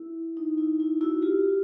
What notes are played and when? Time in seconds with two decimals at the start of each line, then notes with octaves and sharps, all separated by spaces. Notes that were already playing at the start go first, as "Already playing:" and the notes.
Already playing: E4
0.37 D#4
0.58 E4
0.80 E4
1.01 E4 F#4
1.22 F4 G4